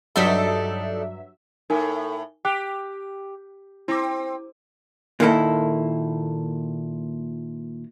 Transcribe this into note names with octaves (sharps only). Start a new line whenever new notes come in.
G2 F#3 D4 D#4 A4 E5
A2 A3 D#4 A#4 G#5
G4 G5 D6 F#6
C4 E4 D6
A#2 D#3 A#3 E4 A4